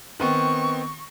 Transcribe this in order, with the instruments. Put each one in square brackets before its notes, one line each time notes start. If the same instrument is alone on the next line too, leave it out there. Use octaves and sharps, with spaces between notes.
[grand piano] D#3 B3 C4 [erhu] C#6